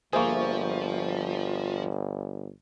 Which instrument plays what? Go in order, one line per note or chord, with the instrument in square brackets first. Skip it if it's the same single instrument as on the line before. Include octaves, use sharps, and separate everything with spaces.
[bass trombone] G1 [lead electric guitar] F3 [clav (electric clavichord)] A#3 G#4 [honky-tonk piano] C5 E5 C#6